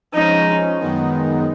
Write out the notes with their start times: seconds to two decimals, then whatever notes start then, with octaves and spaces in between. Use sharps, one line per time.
0.13 F3 G#3 C#4 D#4
0.79 F#2 D#3 G#3 B3 D#4